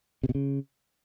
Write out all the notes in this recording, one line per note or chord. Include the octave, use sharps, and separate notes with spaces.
C3
B2
C#3